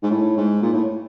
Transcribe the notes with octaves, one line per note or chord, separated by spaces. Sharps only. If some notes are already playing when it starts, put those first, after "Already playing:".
G#2
A2
G#2
A#2
A2